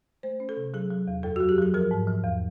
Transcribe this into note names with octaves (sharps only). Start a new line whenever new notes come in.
A3 C5
C#4
A4
C3
F#3 G#4
F#3
E2
F#2 A4
F#3 F#4
G4
F#3 G#4
F3 A#4
G#2
F3
E2